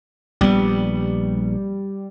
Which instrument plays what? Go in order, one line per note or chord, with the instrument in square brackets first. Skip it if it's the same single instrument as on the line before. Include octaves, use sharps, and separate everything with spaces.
[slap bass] A#1 B3 [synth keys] G3